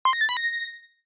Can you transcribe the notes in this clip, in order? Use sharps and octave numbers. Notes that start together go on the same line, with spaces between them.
C6
A#6
A6
B5
A#6